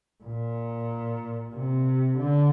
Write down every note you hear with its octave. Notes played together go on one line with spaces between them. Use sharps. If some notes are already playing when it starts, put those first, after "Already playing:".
A#2
C3
D3